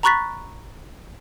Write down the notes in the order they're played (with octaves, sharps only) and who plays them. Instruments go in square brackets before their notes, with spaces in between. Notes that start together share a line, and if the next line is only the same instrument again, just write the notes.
[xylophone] A#5 B5 C#6 F#6 A6 B6